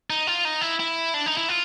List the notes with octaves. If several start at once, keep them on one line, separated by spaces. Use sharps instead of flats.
D#4
F4
D#4
E4
E4
D4
D#4
E4
F4